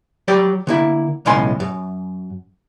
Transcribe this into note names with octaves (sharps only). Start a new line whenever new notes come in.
F#3 G4 D5
D3 A#3 E4
B1 A2 C#3 G#3 G#5 C6
F#2